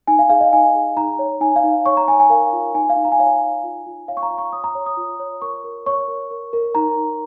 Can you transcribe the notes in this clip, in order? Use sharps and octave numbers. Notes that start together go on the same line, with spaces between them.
D#4 G#5
F5
G#4 F5
D#5
D#4 G#5
G#4
D#4 A#5
C#5
D#4 G#5
F5
D#4
C#5 C#6
A#5
C#5 G#5
G#5
A#4 F5
F4
D#4 G#5
F5
D#4
A#5
G#5
C#5 F5
G#5
D#4
F4
F4
C#5 F5
C#6
A#5
F4
C#6
C#5 D#6
A#5
C#5
D#6
F4
C#5
A#4 C#6
A#4
C#5 C#6
A#4
A#4
A#4
D#4 A#5
D#4